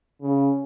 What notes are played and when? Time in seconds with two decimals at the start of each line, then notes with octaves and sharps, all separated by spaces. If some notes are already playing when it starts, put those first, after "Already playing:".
0.22 C#3